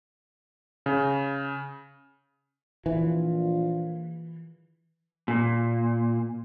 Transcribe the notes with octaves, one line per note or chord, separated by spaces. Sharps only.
C#3
A#1 E3 F4
A#2